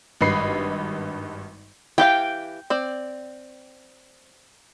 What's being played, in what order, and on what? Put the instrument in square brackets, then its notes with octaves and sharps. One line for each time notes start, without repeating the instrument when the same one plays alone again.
[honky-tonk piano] G#1 G2 B4 D#5 B5 C7
[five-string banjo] E3 G4 F5 [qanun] G5
[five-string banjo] C4 D5